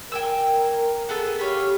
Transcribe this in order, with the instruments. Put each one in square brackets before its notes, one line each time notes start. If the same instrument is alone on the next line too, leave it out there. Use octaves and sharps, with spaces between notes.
[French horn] A#4 [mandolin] G5 G#5 E6
[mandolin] B3 G#4 A4
[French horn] G4 [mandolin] B4 C#5 F5